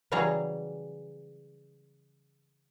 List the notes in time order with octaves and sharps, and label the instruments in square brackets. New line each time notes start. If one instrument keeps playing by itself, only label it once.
[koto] C#3 E3 F#3 G3 G#4 A#5